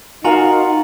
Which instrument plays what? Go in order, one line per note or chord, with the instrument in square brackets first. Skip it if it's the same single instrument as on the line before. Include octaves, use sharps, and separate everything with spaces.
[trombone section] D#4 [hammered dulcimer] F4 A#4 F5 [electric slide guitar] F#4 [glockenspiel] G#5 A#5 F#7